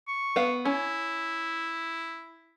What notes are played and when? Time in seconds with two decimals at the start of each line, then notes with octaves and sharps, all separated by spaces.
0.08 C#6
0.36 B3 F5
0.65 C#4 E4